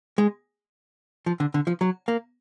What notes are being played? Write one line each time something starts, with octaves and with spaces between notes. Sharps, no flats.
G#3
F3
D3
D3
F3
F#3
A#3